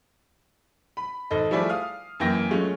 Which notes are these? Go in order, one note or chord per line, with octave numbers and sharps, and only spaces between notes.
B5
G#1 A4 D#5
F3 G3 A3 E4 G#4 D5
F5 D#6 F6
F#2 E3 A#3 G5 A#6
F#3 G#3 A3 C#4 F4